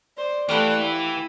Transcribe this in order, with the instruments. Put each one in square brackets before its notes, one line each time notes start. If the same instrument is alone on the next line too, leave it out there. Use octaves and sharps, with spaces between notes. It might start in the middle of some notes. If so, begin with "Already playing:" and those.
[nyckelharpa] C5 [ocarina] D5
[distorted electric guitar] E3 [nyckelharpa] A3 F#5 [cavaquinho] G4 F5 B5
[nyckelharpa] E4